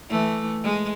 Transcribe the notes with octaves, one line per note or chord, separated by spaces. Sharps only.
E3 A3
G#3